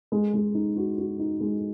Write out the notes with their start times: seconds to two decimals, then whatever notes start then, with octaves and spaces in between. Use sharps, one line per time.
0.12 G#3
0.34 G#3
0.55 D#4
0.76 F#4
0.98 F#4
1.19 D#4
1.41 G#3